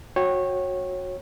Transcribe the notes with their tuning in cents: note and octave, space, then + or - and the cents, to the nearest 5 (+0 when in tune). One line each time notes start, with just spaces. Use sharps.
F#4 -15 C#5 -20 G5 +0